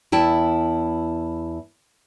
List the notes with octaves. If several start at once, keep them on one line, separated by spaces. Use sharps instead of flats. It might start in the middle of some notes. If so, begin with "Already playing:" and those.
E2 E4 G5 A5